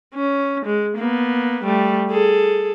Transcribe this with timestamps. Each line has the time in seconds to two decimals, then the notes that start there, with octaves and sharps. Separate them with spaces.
0.15 C#4
0.66 G#3
0.97 A#3 B3
1.64 G3 A3
2.10 G#4 A4